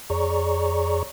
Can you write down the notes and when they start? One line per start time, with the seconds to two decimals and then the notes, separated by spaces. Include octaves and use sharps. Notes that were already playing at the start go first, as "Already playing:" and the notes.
0.10 F2 G#4 C#5 D5 A#5 C#6